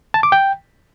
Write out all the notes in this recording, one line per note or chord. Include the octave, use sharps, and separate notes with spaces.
A5
D6
G5